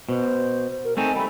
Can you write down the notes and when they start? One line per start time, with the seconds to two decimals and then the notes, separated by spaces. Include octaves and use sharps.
0.09 B2 C5
0.85 A#4
0.97 A3 C4 D#4 G#5
1.16 G3 A3 B5